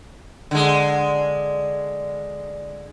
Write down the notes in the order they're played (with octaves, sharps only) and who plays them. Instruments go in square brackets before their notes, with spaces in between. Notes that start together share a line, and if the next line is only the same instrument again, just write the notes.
[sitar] D3 G#3